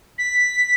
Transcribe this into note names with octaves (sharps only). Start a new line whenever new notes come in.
B6